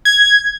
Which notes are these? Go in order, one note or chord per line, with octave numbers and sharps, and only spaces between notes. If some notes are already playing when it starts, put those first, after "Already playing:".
G#6